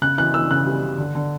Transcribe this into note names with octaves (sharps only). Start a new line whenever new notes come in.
C#3 F#6
E3 F#6
E3 E6
C#3 F#6
G3
C#3
D3
D3